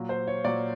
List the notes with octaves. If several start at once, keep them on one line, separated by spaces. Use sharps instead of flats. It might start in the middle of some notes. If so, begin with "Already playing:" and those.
Already playing: A#2 F#3
C5
C#5
A#2 F#3 D5